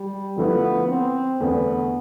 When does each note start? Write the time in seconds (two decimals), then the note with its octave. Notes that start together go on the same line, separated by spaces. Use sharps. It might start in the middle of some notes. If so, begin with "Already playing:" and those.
Already playing: G3
0.37 D3 F3 A3 B3 E4 B4
0.88 C4
1.40 E2 D3 A3 B3